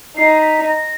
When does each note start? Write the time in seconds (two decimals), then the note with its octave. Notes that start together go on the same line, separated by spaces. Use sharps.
0.17 D#4 C7
0.42 B6
0.67 A#6